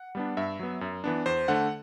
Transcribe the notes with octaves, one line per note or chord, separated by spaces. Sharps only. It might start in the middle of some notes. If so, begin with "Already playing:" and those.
Already playing: F#5
G3 B3 D4
G2 E5
F#3 B3
F#2
E3 B3 D4
E2 C5
D3 A3 F#5